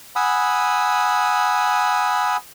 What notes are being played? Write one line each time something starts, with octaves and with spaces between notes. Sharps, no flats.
F#5 G#5 B5 D#6 E6